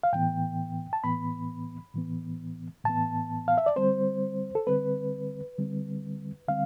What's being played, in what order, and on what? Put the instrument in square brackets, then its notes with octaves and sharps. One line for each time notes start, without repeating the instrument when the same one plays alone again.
[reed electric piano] F5
A2 E3 B3 G5
A5
A2 E3 B3 B5
A2 E3 B3
A2 E3 B3 A5
F5
E5
D5
D3 G3 C4 C5
A4
D3 G3 C4 B4
D3 G3 C4
D3 G3 C4 F5